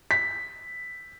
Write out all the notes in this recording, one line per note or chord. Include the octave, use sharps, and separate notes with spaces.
B6